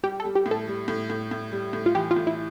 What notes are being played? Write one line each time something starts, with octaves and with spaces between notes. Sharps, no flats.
G3 G4
A4
G3
G4
A2
A4
G3
A2
A2
A2
G3
A2
F4
E3 G4
F4
A2
E4